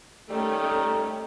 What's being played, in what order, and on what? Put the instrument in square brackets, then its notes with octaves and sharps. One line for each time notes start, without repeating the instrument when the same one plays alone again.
[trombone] D#3 [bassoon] G3 [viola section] A3 C#4